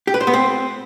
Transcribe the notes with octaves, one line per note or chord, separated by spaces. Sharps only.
G4
B4
C5
B3
C4